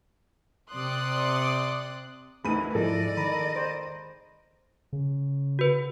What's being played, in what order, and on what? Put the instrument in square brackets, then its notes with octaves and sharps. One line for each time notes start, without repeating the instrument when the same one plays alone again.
[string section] C3 D5 C6 D#6 F#6
[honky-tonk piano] D2 D#7 [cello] E3 [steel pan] D#4 G#4 [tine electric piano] B5
[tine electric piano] G#2 F3 E4 [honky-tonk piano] G#3 A4 [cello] D5 D#5
[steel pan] D#3 [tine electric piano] A#5 B5
[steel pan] C5
[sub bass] C#3
[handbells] F#4 B4